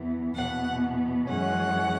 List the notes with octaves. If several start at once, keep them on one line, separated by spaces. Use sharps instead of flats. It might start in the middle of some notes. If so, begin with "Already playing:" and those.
Already playing: E2 E3 B3
E2 B2 B3 F#5
F#2 E3 G#3 C#4 F#5